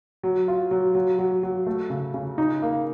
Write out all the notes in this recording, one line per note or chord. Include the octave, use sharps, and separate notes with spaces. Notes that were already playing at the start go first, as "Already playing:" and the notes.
F#3
F4
F#3
F#3
F#3
F#3
A3
C#3
C#3
D#4
A#3